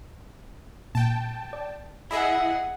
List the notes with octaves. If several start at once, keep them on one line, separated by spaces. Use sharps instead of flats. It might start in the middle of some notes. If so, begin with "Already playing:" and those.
A#2 G5 A5
D5
E4 G#4 D#5 E5 F#5 B5